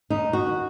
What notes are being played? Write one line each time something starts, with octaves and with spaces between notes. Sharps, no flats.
D#2 D#4
F#4